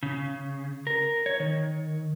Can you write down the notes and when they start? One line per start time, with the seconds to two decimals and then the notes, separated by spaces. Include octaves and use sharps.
0.03 C#3
0.87 A#4
1.26 C#5
1.40 D#3